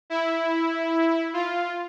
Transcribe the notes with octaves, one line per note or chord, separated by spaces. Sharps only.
E4
F4